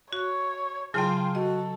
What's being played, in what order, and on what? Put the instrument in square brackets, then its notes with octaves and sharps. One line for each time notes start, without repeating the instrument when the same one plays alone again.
[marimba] F#4 F#6 [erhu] C#5
[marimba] C#3 F#3 [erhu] F4 [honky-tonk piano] G#4 F5 G5 [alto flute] A5
[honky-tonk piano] F#3 [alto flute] F#4 [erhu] A4 [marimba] D#5